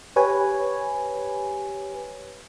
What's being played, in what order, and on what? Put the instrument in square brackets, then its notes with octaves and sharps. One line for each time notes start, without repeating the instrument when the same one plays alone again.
[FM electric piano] G4 B4 C#5 G#5